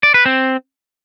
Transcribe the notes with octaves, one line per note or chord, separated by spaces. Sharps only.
D5
B4
C4